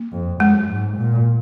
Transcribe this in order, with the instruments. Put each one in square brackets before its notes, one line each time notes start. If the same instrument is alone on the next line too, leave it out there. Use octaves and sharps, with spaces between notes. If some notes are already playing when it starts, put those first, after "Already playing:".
Already playing: [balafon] A#3
[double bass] F2
[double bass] F#2 [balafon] G#3
[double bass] G#2
A#2